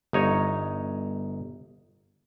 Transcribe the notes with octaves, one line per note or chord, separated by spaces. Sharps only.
G1 D#4 C#5